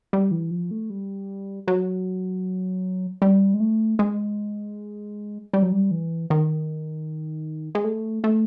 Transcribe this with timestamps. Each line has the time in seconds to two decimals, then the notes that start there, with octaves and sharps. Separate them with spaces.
0.13 G3
0.31 E3
0.51 F3
0.71 A3
0.90 G3
1.68 F#3
3.22 G3
3.54 G#3
3.60 A3
3.99 G#3
5.54 G3
5.63 F#3
5.72 G3
5.91 E3
6.30 D#3
7.75 G#3
7.84 A3
8.24 A3